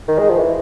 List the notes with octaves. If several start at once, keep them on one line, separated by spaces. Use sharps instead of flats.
D#3
G#3
F3
E3